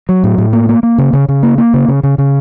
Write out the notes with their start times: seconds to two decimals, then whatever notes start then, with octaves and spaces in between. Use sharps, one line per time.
0.09 F#3
0.24 A2
0.38 A2
0.53 A#3
0.69 A#3
0.83 A#3
0.98 C#3
1.13 C#3
1.29 C#3
1.43 A#3
1.58 A#3
1.74 C#3
1.88 C#3
2.03 C#3
2.18 C#3